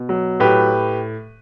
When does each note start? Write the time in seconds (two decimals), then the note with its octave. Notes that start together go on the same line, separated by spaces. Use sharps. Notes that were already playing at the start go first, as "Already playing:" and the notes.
Already playing: B2
0.09 F#3
0.40 A2 G4 B4